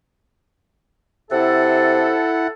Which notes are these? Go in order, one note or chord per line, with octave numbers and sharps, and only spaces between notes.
C3 E4 A4 F#5